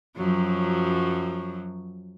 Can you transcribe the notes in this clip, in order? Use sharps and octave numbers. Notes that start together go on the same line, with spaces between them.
F#2 F3 F#3